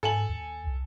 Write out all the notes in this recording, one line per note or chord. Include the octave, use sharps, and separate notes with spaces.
G#2 A4 G#5 F#7
D#2
C2